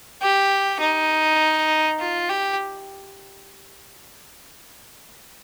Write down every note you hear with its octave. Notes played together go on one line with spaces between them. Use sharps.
G4
D#4
F4
G4